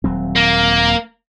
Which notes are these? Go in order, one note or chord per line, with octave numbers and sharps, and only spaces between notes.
D#1 F#3 C4
A#3